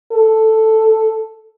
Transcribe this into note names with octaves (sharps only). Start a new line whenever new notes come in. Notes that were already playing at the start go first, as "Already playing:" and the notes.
A4